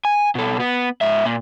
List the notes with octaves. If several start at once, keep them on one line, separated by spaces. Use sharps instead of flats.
G#5
B2 A4
B3
G#2 E5
A#2